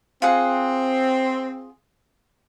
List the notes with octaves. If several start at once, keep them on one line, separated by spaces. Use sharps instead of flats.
C4 F4 G#4 F#5